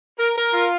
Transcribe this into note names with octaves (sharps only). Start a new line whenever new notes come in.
A#4
A#4
F4